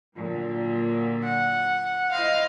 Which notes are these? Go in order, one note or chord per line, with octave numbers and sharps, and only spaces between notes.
A#2 D3 F#3
F#5
E4 C5 D#5 F5